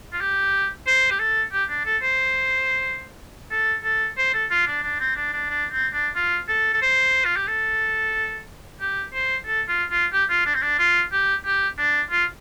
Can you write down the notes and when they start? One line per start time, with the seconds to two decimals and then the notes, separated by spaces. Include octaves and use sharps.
0.13 F4
0.21 G4
0.87 C5
1.11 G4
1.19 A4
1.52 G4
1.69 D4
1.85 A4
2.02 C5
3.51 A4
3.84 A4
4.17 C5
4.34 A4
4.51 F4
4.67 D4
4.83 D4
5.00 C4
5.16 D4
5.33 D4
5.50 D4
5.72 C4
5.93 D4
6.15 F4
6.48 A4
6.74 A4
6.82 C5
7.25 F4
7.36 G4
7.48 A4
8.80 G4
9.13 C5
9.46 A4
9.68 F4
9.90 F4
10.13 G4
10.29 F4
10.46 D4
10.54 C4
10.62 D4
10.79 F4
11.12 G4
11.45 G4
11.78 D4
12.11 F4